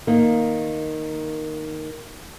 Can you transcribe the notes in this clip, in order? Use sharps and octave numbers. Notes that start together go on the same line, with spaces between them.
D#3 A#3